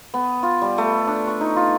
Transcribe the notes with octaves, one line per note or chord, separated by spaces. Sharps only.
B3
F4
G3
A3
D4
C#6
D#4
F4